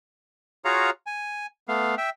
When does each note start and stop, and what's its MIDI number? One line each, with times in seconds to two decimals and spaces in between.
0.65 0.90 65
0.65 0.90 66
0.65 0.90 68
0.65 0.90 73
0.65 0.90 77
0.65 0.90 82
1.06 1.46 80
1.68 1.95 57
1.68 1.95 59
1.68 1.95 77
1.98 2.10 76
1.98 2.10 79